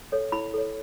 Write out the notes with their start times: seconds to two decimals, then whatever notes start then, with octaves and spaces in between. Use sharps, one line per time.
0.12 A4 C#5
0.32 E4 B5
0.54 A4 C#5